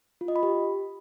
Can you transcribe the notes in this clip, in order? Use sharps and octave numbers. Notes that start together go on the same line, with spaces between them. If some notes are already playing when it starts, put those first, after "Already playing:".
F4
D#5
B5
G4